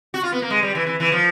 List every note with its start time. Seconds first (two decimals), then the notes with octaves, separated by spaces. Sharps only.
0.14 F#4
0.23 F4
0.32 B3
0.42 A#3
0.50 G#3
0.63 G3
0.75 E3
0.87 E3
1.00 E3
1.12 F3